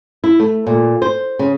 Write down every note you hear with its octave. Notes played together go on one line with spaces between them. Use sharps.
E4
A3
A#2
C5
C#3